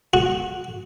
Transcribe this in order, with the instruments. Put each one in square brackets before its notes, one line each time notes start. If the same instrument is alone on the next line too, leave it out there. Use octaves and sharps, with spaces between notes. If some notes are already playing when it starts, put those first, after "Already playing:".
[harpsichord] F#4